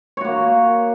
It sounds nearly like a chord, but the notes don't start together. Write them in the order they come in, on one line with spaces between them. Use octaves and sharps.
C#5 F#4 A#3